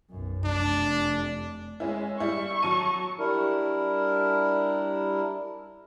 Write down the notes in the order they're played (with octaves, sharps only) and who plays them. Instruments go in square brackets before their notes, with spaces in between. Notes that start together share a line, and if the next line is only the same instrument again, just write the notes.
[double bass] B1 F#2
[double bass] F1 [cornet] D4
[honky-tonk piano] G#3 C#4 E4
[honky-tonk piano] G3 E4 [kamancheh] C#6
[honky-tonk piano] F#3 A5 D#7
[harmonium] G3 D4 E4 A#4